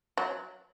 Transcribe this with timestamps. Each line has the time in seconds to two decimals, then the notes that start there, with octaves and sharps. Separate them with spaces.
0.17 F#3